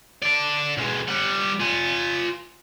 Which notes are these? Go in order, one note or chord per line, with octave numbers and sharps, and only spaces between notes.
A4 D5
B1 G#3
G3 F#5
F4 G#5